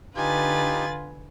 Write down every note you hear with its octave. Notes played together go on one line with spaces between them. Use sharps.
D3 D#4 F4 G4 B4 G#5 A6